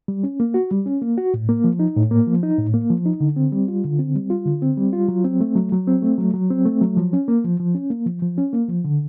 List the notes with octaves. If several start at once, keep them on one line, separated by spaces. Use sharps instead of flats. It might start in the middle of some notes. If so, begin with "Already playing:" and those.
G3
C#4
A#3
F#4
G3
C#4
A#3
F#4
A2
A#3
F3
D#4
A2
A#3
F3
D#4
A2
A#3
F3
D#4
D3
C4
G3
F4
D3
C4
G3
F4
D3
C4
G3
F4
F#3
C4
A3
F#3
F#3
C4
A3
F#3
F#3
C4
A3
F#3
F3
C#4
A#3
F3
F3
C#4
A#3
F3
F3
C#4
A#3
F3
D3